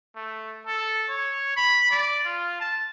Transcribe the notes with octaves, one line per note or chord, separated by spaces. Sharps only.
A3
A4
C#5
B5
D5
F4
A5